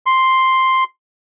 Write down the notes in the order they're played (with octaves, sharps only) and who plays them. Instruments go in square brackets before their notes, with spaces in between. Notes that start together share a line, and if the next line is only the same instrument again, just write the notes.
[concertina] C6